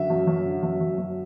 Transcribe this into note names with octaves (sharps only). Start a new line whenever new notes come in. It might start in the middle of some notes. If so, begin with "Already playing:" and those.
Already playing: F#2 D3 E5
F#2
F#2
D3
F#2
F#2
F#2